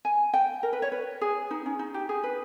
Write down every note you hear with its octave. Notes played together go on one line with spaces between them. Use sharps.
G#5
G5
A#4
B4
C#5
B4
G#4
D#4
C#4
D#4
G4
G#4
B4